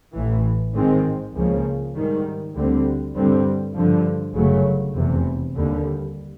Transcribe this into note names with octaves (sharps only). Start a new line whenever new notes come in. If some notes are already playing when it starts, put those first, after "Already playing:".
A1 A2 E3
G#2 D#3 G#3 C4
C#2 C#3 F3 A#3
G#2 D#3 G3
D2 D3 G3 C4
G2 D3 G3 C4
G2 D3 F3
G1 F#2 C#3 F#3 A3
F1 E2 C3 E3
D#2 D3 G3